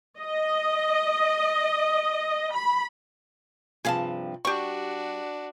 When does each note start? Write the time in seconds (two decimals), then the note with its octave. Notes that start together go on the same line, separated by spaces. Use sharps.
0.20 D#5
2.53 B5
3.85 G2 C3 F3 G#4 F5 A5
4.45 G3 D4 F#4 G4 C#6